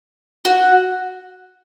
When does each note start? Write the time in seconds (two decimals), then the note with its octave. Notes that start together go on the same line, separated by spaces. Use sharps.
0.45 F#4